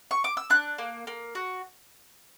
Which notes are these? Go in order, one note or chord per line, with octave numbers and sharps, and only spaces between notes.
C#6
D6
E6
D4 F#6
A#3
A#3
F#4